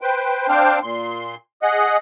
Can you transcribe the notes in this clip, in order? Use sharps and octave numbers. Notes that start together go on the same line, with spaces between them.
B4 C5 G5
C4 D4 C5 F5 G5
A#2 C6
G#4 D#5 F#5